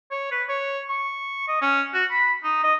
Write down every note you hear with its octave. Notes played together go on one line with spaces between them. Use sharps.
C#5
B4
C#5
C#6
D#5
C#4
F#4
B5
D#4
D#5